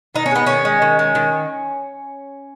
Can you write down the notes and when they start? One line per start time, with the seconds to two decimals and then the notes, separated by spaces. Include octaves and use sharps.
0.15 D#3 D#4
0.26 C#4
0.31 G#3 B3
0.46 D#3 C#4
0.65 G#3
0.82 D#3
0.99 G#3
1.15 D#3